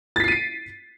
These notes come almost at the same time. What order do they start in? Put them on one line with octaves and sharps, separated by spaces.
A6 B6 C7 D#7 D7